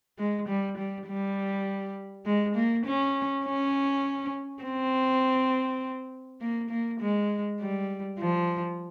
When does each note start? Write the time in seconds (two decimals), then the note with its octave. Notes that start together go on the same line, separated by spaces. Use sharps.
0.18 G#3
0.48 G3
0.77 G3
1.07 G3
2.26 G#3
2.55 A#3
2.86 C#4
3.45 C#4
4.63 C4
6.40 A#3
6.70 A#3
7.00 G#3
7.60 G3
8.19 F3